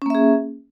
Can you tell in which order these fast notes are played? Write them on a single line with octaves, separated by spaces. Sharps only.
C#4 A#3 E5 G#4